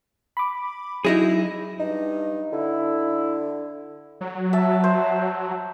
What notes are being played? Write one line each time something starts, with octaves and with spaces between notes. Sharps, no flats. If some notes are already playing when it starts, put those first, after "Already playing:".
B5 D6
F#3 D#4 E4 G#4 A#6
G2 D#4
D3 E4
F#3
E5 A5
C5